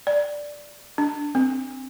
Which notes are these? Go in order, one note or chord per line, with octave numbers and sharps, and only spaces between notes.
D5
D4
C4